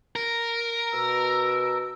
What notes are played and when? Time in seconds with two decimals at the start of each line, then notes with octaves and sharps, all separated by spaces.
0.16 A#4
0.94 B2 E6